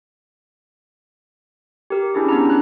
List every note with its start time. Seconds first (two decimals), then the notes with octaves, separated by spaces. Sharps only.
1.90 G4 A#4
2.14 C#4 D4 E4 G4 G#4
2.29 B3 D4 E4 A#5
2.46 A#5 F#6